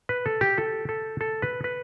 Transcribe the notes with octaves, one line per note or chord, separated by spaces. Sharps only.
B4
A4
G4
A4
A4
A4
B4
B4